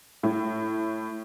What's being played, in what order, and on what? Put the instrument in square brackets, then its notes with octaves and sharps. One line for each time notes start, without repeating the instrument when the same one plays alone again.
[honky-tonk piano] A2